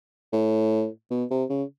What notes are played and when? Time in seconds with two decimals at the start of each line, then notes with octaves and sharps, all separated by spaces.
0.32 A2
1.10 B2
1.31 C3
1.50 C#3